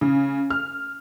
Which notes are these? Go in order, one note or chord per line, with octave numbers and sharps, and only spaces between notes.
C#3
F6